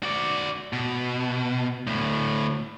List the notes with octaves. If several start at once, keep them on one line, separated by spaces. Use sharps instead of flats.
F#4 D5
B2
D2 A2